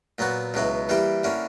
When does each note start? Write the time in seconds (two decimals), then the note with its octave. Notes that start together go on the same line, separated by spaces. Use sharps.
0.18 A#2 F#3 B3 F#4
0.54 C#2 B2 F#3 B3 E4
0.89 E3 G3 A#3 E4 G4
1.24 D3 A#3 C#4 E4